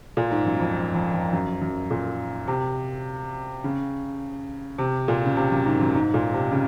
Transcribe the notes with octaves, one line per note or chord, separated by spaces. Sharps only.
A#2
G#2
F#2
F2
F2
F2
F#2
F#2
A#2
C3
C#3
C3
A#2
C#3
C3
F#2
G#2
F#2
G#2
A#2
C3
C#3